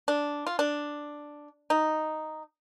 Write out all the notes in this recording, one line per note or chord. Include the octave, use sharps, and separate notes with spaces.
D4
F4
D4
D#4